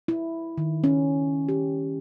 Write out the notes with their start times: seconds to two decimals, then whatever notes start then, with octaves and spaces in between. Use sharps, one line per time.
0.08 E4
0.58 D#3
0.84 C#4
1.49 G4